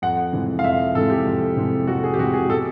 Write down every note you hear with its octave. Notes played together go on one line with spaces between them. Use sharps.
F2 F#5
C3 E3 G#3
F5
F2 E5
C3 E3 G#3 A4
G4
F2
C3 E3 G#3
F2 F#4
G#4
G4
C3 E3 G#3 F#4
G#4
B2 A4